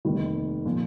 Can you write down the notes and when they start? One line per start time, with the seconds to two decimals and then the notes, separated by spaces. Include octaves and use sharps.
0.05 F1 D#2 D#3 G3
0.66 A#2 F3 A#3